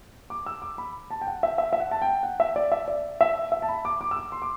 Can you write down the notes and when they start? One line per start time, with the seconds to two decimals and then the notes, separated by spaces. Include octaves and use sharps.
0.30 D6
0.46 E6
0.62 D6
0.78 B5
1.10 A5
1.21 G5
1.27 F#5
1.43 E5
1.58 E5
1.73 E5
1.80 F#5
1.91 A5
2.02 G5
2.23 F#5
2.40 E5
2.56 D5
2.72 E5
2.88 D5
3.21 E5
3.52 E5
3.62 A5
3.69 B5
3.85 D6
4.01 D6
4.11 E6
4.17 D6
4.32 C6
4.42 D6